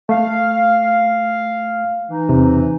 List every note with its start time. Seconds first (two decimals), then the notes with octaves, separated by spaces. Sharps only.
0.09 A3 F5
2.10 E3 D#4
2.29 E2 C3